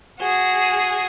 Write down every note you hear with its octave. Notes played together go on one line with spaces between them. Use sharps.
F#4 G#4